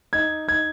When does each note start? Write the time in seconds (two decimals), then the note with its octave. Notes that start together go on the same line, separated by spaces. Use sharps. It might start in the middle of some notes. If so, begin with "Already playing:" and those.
0.13 D#4 G#6
0.48 D#4 G#6